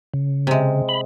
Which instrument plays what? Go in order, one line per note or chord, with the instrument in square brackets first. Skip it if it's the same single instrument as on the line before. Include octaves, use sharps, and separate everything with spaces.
[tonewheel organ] C#3
[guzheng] C3 G#3
[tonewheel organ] B5